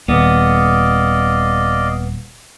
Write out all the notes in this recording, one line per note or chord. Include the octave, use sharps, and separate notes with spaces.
D#1 B3 D5 D#5 F5